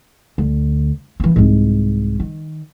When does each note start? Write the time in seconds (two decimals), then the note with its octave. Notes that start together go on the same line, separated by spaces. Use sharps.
0.38 D2
1.20 E3 A#3
1.36 C2 G#2
2.20 D#3